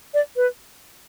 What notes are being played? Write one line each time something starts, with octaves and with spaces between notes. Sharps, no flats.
D5
B4